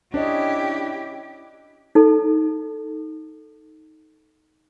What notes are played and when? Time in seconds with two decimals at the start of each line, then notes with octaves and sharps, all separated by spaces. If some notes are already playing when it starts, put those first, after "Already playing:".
0.14 C#4 D4 E4 G4 C#5 D#5
1.95 D#4 A4